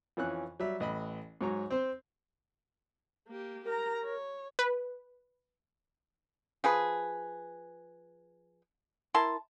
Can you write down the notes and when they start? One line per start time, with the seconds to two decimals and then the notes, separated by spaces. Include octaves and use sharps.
0.17 F2 E3 C#4 F#6
0.60 F#3 G3 E5
0.80 A1 D#5 B5
1.41 G#2 F#3 C#5 A#5
1.70 C4 C5
3.28 A#3 G4
3.65 G4 A#4 A#5
4.05 C#5
4.59 B4
6.64 F3 G#4 B4
9.14 E4 A#4 A5 C6